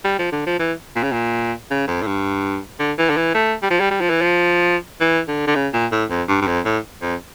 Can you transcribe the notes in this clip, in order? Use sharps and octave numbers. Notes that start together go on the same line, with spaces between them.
G3
F3
D3
F3
E3
A#2
C#3
A#2
C#3
F2
A2
G2
D3
E3
D3
E3
A3
G3
F3
G3
G3
F3
E3
F3
E3
D3
D3
C#3
A#2
A2
F2
G2
G2
F2
A2
F2